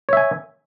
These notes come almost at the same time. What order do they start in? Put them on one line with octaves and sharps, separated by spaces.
C#5 E5 G#5